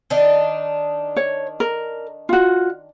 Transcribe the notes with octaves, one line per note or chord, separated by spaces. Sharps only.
D#3 D4 D#4
C#5
A#4
F4 F#4